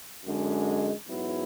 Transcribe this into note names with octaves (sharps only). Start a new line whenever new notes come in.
F#2 D3 G#3
G#2 F#3 B3 E4